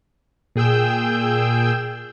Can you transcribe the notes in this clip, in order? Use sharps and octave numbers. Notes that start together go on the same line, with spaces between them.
A#2 G#4 G5 E6 G6